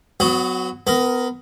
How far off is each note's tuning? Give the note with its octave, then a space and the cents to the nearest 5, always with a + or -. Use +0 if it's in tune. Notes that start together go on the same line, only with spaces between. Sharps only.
F#3 -15 B3 +30 F#4 +0
B3 +25 A#4 +0